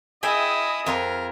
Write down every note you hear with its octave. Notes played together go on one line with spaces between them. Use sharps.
E4 G#4 D#5 E5 G5 D#6
F2 F4 A#4 F5